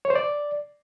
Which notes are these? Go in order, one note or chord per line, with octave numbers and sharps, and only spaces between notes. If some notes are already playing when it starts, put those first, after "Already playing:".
C#5
C5
D5